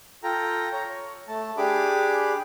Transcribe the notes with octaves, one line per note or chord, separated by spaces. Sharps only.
F4 A4 G5 A#5
C#5 A#5
C#5
A3 A5
D4 G4 G#4 B5 D6